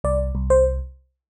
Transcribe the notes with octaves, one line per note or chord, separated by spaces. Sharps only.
C2 D5
C2
C5